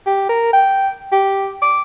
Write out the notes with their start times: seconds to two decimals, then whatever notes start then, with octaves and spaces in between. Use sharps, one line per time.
0.07 G4
0.29 A#4
0.53 G5
1.12 G4
1.62 D6